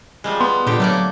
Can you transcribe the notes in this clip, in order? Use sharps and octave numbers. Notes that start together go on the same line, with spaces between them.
F3 G3 G#3
B3 C6
A#2 D3 G4
F#3 A3 A#3 D5